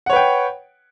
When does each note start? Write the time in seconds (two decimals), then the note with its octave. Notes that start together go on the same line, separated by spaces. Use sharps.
0.06 F#5
0.10 C#5
0.13 B4
0.16 G5